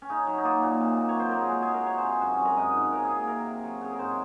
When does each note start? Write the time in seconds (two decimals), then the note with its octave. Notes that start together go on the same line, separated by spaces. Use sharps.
0.02 C#4
0.10 C#3 D#4
0.27 F#3
0.38 D#4
0.44 A#3 F4
0.63 A#2
0.81 C3
0.98 A#3
1.09 C#5
1.15 F#3 C5
1.29 A#3 A#4
1.41 G#4
1.50 G#3 F#4
1.62 G#4
1.68 G#3
1.74 A#4
1.87 C3 C#5
1.98 C5
2.03 C3
2.10 G#4
2.21 F#2 F#4
2.34 C#4
2.40 F#2
2.45 A#4
2.57 G#2 D#5
2.76 G#2
2.92 C#3 A#4
3.05 G#4
3.10 A#3
3.17 G#4
3.28 C3 A#4
3.46 C3
3.64 F#3
3.81 C#3 G#4
3.92 A#4
3.99 G#2 C5